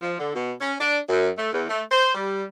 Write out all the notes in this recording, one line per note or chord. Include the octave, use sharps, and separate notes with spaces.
F3
D3
B2
C#4
D4
F#2
A3
E2
A3
C5
G3